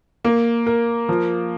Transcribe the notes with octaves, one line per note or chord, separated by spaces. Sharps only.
A#3
A#4
F3